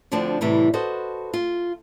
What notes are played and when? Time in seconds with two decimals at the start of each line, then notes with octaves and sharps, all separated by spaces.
0.12 D2 D3 F3 C4 D4
0.41 A2 C3 E3 G3
0.74 F#4 A4 B4 C5 D#5
1.34 F4